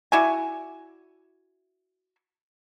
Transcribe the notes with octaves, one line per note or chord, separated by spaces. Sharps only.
E4 F#4 D5 G#5